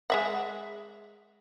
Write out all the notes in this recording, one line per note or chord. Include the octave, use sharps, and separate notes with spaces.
G#3 E5 F#5